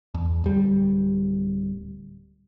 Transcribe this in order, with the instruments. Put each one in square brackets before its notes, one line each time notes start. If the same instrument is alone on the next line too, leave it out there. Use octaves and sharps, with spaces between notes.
[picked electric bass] E2
D1 G3